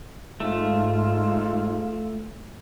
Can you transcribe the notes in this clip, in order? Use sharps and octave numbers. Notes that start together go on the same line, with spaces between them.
G#2 A3 F4